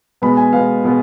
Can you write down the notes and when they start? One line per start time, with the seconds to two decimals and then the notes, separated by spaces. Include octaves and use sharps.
0.22 B2 G#3 B3 B5
0.37 G#5
0.53 B2 G#3 B3 F5
0.84 B2 G#3 B3